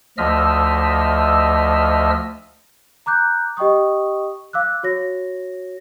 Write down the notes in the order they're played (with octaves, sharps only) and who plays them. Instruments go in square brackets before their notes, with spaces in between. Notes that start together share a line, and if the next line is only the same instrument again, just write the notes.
[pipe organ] D2 F3 D#5 E5 E6 F6
[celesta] A#5 D6 F#6 G6
G4 D#5 G5 C#6 D#6
F5 D6 E6 F#6
F#4 C#5 A#6